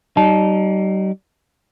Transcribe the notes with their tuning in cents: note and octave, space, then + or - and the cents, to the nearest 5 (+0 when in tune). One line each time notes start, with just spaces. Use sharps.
G3 -40 D#4 -15 A5 -20